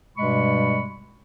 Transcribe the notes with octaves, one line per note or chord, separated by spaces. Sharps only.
G2 B2 G3 G#3 B5 C#6